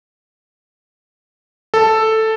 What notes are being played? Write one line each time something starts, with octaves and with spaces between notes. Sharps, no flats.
A4